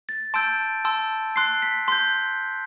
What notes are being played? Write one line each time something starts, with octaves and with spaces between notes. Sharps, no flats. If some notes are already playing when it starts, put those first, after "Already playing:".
A6
A5 C6 E6 G6 D7
A5 C6 E6
C6 F#6 C7
B6
C6 G6